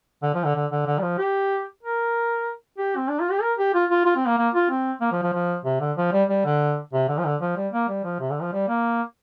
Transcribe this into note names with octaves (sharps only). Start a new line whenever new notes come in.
D3
F3
D3
D3
D3
D3
G3
F3
G4
A#4
G4
C4
D4
F4
G4
A#4
G4
F4
F4
F4
C4
A#3
A#3
F4
C4
A#3
F3
F3
F3
C3
D3
F3
G3
G3
D3
C3
D3
F3
D3
F3
G3
A#3
G3
F3
C3
D3
F3
G3
A#3